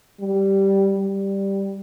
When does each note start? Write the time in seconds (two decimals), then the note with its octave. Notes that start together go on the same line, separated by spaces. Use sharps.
0.21 G3
0.98 G3